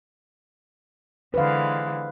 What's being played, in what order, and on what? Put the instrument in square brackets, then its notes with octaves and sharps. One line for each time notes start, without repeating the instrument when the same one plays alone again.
[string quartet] D3 E3 G#3 [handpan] B4 C5 F5